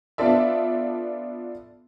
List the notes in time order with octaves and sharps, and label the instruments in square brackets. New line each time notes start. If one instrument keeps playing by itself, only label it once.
[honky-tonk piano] B3 D4 F4 A4 D5 E5